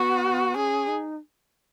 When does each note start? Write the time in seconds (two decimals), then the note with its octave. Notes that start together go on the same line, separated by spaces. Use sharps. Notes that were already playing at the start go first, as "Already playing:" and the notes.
Already playing: B3 F#4
0.56 C#4 G#4
0.88 D#4